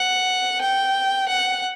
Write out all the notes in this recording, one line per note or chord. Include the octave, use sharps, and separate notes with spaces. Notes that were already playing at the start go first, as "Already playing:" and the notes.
Already playing: F#5
G5
F#5